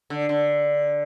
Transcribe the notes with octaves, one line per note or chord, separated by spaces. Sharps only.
D3
D3